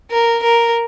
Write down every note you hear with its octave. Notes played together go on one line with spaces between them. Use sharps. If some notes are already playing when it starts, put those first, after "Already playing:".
A#4
A#4